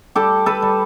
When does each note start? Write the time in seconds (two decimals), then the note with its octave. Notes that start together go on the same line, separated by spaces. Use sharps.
0.15 G3 G4 A4
0.46 A4 B4
0.62 G3